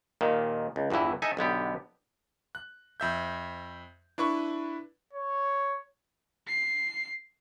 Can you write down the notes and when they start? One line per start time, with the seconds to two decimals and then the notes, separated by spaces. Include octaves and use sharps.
0.21 D#2 A#2 D#3
0.76 C#2
0.90 G1 E2 G2 E3 E4
1.22 D#4 A4 E5 G#5
1.37 B1 D3 B3 G4
2.55 F#6
3.00 F2 E5 G6
4.18 D4 E4 B4 C#6
5.13 C#5
6.47 C7